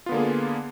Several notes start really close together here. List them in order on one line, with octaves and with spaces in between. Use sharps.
F4 B3 D3 A#3 G#4